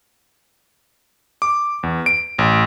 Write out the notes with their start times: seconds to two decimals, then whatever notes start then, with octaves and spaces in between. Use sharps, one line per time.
1.42 D6
1.83 E2
2.06 D7
2.39 A1